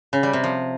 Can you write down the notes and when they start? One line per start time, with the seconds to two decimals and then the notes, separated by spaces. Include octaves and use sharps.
0.13 C#3
0.23 G3
0.33 C3
0.44 F3